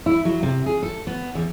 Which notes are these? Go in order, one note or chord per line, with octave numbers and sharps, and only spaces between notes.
E4
F#3
C3
G#4
A4
B3
E2